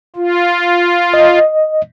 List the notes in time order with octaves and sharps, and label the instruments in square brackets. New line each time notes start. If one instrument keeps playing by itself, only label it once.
[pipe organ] F4
[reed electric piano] D#5